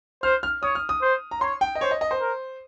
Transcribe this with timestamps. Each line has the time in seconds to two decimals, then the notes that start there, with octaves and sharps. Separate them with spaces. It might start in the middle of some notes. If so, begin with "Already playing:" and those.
0.23 C5 F6
0.43 F6
0.63 C#5 D#6
0.75 F6
0.89 D#6
1.02 C5
1.31 A#5
1.41 C#5 C6
1.61 G5
1.75 D#5
1.81 C5 C#5
1.91 D#5
2.01 D#5
2.11 C5
2.20 A#4